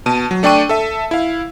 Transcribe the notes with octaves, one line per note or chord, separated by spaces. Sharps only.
B2 A5 D#7
F#3
A3 D4 D5 G5 C#6 D#7
A4 E5
E4 F5